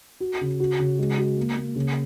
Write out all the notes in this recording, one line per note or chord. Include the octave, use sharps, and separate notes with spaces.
F#4
C#3
F#4
C#3
G#3
F#4
A#3
A#3
C#3